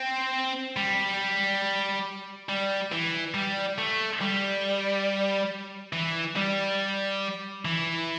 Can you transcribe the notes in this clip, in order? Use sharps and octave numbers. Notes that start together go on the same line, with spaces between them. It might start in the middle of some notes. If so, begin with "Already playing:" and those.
Already playing: C4
G3
G3
E3
G3
A3
G3
E3
G3
E3